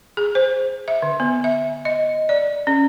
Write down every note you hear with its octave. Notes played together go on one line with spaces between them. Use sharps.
G#4
C5
E5
D3
B3
E5
D#5
D5
C#4